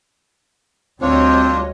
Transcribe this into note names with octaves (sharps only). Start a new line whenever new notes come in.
D2 G3 C4 D4 F4 C#5 D#5